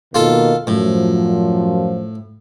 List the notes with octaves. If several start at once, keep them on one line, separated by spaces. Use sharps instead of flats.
B2 D#3 A#3 F4 A4
F#2 A2 F3